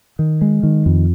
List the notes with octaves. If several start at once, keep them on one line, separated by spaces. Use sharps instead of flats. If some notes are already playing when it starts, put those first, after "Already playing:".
D#3
G#3
D#3
F2